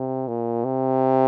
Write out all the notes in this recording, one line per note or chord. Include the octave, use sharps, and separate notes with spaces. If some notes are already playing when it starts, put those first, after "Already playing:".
Already playing: C3
A#2
C3